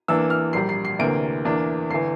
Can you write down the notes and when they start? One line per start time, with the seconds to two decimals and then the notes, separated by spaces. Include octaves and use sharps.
0.08 E2 E3 A#3 D4 E6
0.30 F6
0.53 A#1 A#2 G3 C7
0.69 C7
0.85 C7
0.99 D2 C3 E3 A#3 D7
1.45 E2 E3 A#3 D4
1.90 G1 E3 C7